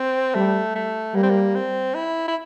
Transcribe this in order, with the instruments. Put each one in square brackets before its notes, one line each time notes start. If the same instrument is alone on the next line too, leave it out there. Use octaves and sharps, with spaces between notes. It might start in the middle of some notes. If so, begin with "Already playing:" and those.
Already playing: [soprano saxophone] C4
[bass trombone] G3 [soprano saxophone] A3
[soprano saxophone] A3
[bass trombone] G3 [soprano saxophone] A#3
[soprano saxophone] C4
A#3
C4
E4
E4